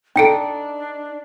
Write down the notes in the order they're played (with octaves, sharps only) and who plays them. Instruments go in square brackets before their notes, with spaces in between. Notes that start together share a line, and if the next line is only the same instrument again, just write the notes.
[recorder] D4 [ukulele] D#4 A4 [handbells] G5 C#7 D7